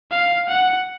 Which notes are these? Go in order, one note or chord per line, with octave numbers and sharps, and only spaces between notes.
F5
F#5